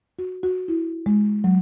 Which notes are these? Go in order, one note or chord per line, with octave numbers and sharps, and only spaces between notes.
F#4
F#4
E4
G#3
F#3